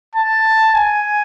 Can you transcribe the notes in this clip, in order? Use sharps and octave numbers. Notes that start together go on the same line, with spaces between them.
A5
G#5